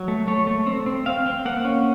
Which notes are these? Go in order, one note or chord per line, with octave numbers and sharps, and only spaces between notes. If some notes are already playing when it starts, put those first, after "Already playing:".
Already playing: F#3
A3
A3 C#5
A3
C4
C4
C4 F5
C4
A#3 F#5
C#4